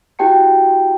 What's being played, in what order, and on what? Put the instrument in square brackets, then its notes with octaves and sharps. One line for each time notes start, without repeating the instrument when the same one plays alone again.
[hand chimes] E4 F#4 G4 G5 A5 C#7